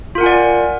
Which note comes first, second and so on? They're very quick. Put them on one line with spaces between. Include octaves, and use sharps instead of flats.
F4 A#4 F#5 G#5 D5